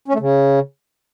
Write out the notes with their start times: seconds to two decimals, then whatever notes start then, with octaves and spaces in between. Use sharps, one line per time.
0.08 C#4
0.14 A3
0.20 C#3